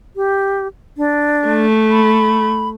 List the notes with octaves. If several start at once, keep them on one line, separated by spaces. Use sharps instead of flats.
G4
D4
A3
B5